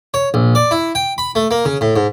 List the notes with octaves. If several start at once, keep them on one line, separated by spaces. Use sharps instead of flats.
C#5
A#1
D5
E4
G5
B5
A3
A#3
C#3
A2
G#2